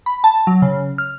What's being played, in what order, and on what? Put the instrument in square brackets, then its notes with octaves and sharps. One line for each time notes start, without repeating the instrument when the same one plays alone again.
[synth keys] B5
A5
F#3
C#3
F6